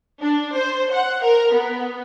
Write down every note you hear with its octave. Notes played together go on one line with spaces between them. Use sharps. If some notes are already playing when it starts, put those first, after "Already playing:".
D4
C5
F#5
A#4
B3